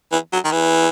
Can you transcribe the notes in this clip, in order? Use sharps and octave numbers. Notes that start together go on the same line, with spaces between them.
E3
F#3
D#3
E3